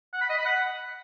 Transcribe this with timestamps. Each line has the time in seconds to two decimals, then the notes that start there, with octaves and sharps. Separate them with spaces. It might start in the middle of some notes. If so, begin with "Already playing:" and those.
0.13 F#5
0.21 B5
0.29 D#5
0.37 B5
0.46 F#5